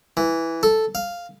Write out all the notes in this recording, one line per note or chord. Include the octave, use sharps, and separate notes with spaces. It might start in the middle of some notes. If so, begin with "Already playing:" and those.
E3
A4
F5